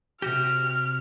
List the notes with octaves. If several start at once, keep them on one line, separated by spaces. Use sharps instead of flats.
C3 F#4 G4 F6